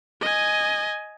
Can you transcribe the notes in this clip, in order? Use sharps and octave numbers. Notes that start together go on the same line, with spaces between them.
D#5 G#5